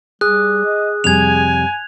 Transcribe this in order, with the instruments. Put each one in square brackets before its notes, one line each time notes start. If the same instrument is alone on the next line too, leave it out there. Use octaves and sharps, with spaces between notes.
[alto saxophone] G3 [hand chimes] G#4 D#6 [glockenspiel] F#6
[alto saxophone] D#5
[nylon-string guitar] F2 C3 G3 [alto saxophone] G#5 [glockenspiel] G#6 F7